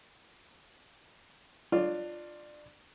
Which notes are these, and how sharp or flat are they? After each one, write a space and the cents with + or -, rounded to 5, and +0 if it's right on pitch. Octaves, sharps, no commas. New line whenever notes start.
D4 +25 F4 +0 C#5 +40